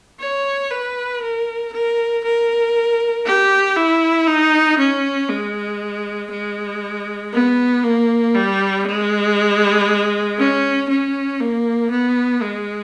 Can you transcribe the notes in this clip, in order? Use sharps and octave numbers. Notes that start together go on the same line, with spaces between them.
C#5
B4
A#4
A#4
A#4
G4
E4
D#4
C#4
G#3
G#3
B3
A#3
G3
G#3
C#4
C#4
A#3
B3
G#3